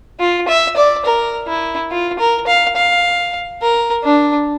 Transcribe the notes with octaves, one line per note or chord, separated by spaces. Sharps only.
F4
E5
D5
A#4
E4
F4
A#4
F5
F5
A#4
D4